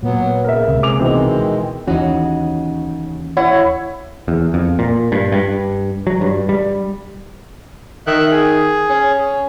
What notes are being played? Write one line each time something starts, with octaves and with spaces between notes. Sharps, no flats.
A#2 F#3 B3
C#3 A#4 E5
C#2 C3
G#4 D6 F7
B2 D#3 E3 G#3 C4
D#2 C#3 E3 C#4 D#4 F#4
E4 C#5 F#5
E2
F2
A#2
G2
G2
F#3
G2
G3
D#3 E5 F#6
G#4
C#4